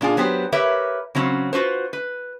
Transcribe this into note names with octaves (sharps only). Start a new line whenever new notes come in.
A#2 D4 F4 G#4
F#3 B3 G4 C5
G4 A#4 B4 C#5 E5
C#3 F#3 C4 C#4
F4 F#4 B4 C5
B4